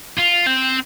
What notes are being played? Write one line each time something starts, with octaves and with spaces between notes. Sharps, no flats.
F4
C4